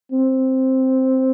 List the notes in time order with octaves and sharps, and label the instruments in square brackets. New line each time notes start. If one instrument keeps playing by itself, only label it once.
[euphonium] C4